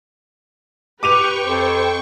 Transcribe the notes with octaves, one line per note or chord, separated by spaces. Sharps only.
G4 B4 G5 C#6 D6 D#7 F7
F2 C5